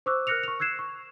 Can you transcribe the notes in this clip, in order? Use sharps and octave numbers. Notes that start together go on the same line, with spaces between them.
C5 C#6 D6 E6 F#6
A#4 F6 F#6 A#6 C#7 F7
C#6 F7
E6 F#6 G#6 C7 E7
C#6